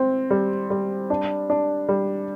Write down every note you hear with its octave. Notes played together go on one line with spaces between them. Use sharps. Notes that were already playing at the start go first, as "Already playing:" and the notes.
Already playing: C4
G3
G3
D4
D4
G3